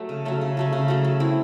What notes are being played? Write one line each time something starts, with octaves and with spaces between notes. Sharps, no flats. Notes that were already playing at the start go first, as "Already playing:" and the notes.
Already playing: F#3 A3
C#3
F#3 A3 C#4
C#3
F#3 A3 C#4
C#3
F#3 A3 C#4
F#3
C4 E4